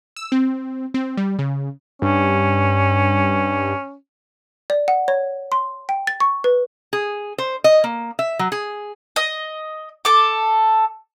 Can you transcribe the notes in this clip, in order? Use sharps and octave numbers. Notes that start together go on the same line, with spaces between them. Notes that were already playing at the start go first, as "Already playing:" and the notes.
E6
C4
C4
G3
C#3
G2 C#4
D5
F#5
C#5
C6
G5
A6
C#6
B4
G#4
C5
D#5
A#3
E5
F#3
G#4
D#5
A4 D6